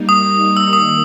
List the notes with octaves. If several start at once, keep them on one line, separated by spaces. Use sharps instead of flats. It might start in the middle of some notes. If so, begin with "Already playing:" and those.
Already playing: G3 A#3 D#4
D#6
E6
D#3 A#3 D#6